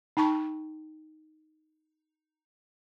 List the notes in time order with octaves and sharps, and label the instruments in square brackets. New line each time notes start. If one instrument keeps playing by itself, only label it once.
[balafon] D#4 G5 A5 C#6